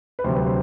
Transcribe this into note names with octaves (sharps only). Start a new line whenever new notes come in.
B4
D2 C3 F#3 C5
B4
C5